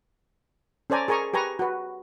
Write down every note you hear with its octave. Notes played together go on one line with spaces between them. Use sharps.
C#4 A4 C5 D5 G#5 A#5
G#4 A#4 G#5 A#5 C#6
G4 B4 G#5 A#5 C#6
F#4 B4